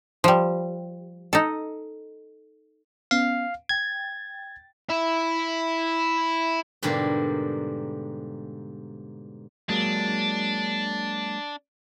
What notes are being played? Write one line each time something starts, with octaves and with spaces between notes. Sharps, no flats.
F3 G3
D#4 A4
B3 C#4 F5
G5 G#6 A6
E4 E5
G#2 B2 D3 G3 A#3
F#3 G#3 A#3 D4